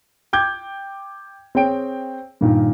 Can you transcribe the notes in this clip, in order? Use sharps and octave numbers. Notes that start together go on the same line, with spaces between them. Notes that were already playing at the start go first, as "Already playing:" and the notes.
G5 D6 G6 G#6
C4 G#4 C#5 G5 D7
G2 A#2 D#3